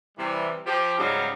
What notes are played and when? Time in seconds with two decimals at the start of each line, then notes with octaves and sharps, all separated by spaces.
0.18 C3 E3 G3
0.65 F3 G4
0.98 G#2 C#3 F#3 G3 D#4 F5